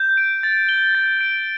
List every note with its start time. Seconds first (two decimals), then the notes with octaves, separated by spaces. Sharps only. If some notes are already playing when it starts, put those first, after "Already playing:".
Already playing: G6
0.17 D7
0.43 A6
0.69 G7
0.95 A6
1.21 D7